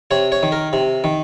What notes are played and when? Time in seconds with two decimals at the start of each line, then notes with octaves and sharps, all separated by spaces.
0.11 C3 C#5
0.32 C#5
0.43 D#3
0.52 A#4
0.73 C3
1.04 D#3